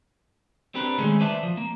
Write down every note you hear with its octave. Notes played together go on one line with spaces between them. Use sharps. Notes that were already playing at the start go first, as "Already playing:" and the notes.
C4 D4 G4 A#4 B4
D#3 G#3 A3 C#4 D#4 G#4
B4 C5 D5 E5 A5
F3
A#3